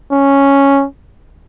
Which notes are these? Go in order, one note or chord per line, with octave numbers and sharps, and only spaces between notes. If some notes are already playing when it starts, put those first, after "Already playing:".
C#4